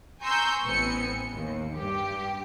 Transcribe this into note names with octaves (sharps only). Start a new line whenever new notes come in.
G#5 A#5 C6 C#6 E6 G6
A1 A2 B3 C4 G#5 C#7
D#2
G2 G4